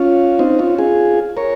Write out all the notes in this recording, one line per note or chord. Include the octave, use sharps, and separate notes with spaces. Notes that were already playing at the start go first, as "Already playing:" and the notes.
Already playing: C#4 F4
C4 D#4
C#4 F4
F4 G#4
A#4 C#5